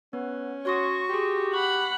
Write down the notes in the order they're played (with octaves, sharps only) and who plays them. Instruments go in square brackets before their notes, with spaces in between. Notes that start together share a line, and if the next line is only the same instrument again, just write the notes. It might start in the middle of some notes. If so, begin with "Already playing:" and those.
[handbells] B3 B4 [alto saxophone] C#4
[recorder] F#4 [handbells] C#5 C6 D#6 [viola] C#6
[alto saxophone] G4 [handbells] G#4 C6
[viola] F#5 B5 [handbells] C#6